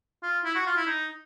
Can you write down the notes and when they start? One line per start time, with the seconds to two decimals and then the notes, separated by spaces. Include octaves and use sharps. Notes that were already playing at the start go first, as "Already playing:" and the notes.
0.23 F4
0.45 E4
0.55 F#4
0.66 F4
0.77 E4
0.87 D#4